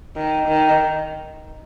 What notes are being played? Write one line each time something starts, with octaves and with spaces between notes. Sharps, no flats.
D#3
D#3